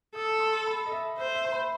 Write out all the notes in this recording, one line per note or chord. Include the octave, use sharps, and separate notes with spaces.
A4 D#6
D#6
C6
B5
D#5
E5
C5 E5
E5
C6
B5